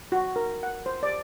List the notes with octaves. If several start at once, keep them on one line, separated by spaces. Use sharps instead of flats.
F#4
A#4
F#5
C5
D5